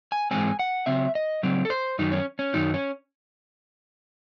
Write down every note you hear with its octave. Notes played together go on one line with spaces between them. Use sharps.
G#5
G#2 E3 G#3 C4 G#5
F#5
C#3 F#3 C4 E5
D#5
C#3 F#3 C4
A4
C5
F#2 D#3 F#3 D#4
C#4
C#4
F#2 D#3 F#3 D#4
C#4